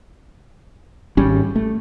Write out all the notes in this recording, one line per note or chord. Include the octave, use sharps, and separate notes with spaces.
G#1 G3 C#4
A3